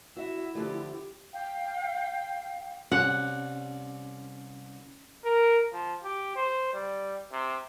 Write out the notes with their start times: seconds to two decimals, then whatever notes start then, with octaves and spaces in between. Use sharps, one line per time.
0.17 E4 F#4 E5
0.55 D3 F3 A3 G4
1.33 F5 G5
2.92 C2 C#4 F#5
5.24 A#4
5.73 F3
6.03 G4
6.36 C5
6.73 G3
7.32 C3